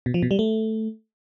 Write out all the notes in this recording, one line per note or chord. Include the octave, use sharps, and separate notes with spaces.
B2
F3
B2
G3
A3